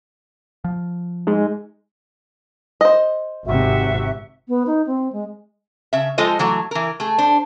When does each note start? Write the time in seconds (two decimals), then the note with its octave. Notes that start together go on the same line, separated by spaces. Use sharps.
0.64 F3
1.27 G#3 D#4
2.81 C5 D#5
3.45 G#1 C3 F#4 E5
4.48 B3
4.67 D#4
4.87 C4
5.13 G#3
5.93 C#3 E5
6.18 F3 G#3 F4 A4 C5 D#5
6.39 E3 F#3 A3
6.71 E3 A#4
7.00 A3 G#4
7.18 D4 C5